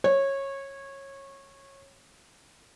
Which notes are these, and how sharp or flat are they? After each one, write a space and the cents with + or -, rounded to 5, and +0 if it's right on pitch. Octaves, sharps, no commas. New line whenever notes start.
C#5 -20